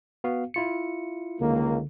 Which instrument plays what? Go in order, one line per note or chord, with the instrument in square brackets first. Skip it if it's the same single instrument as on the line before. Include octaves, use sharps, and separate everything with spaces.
[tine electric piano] B3 F#4 F5
E4 F4 C#7
[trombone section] C#2 D#3 A#3 [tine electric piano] D3